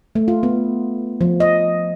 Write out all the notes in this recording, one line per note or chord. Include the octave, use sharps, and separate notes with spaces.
A3
F4
B3
F3
D#5